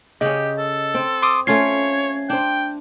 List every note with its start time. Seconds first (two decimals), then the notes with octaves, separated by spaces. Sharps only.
0.21 C#3 C#4 G4 D#5
0.58 A4
0.94 C4
1.22 C6 D6 D#6
1.47 A3 C#4 F4 C#5 G#6 C7
2.30 D4 C5 G5